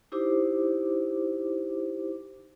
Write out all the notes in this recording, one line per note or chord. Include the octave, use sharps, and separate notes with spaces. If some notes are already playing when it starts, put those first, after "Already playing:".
D#4 E4 G4 C5 D6